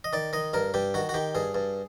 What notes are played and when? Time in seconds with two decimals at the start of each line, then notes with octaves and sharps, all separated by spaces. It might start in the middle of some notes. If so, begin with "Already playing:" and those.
0.04 D#5
0.13 D#3 D5
0.33 D#3 D#5
0.53 G2 A#4
0.74 G2 G4
0.94 D#3 F#4
1.09 F#4
1.14 D#3 G4
1.35 G2 G#4
1.55 G2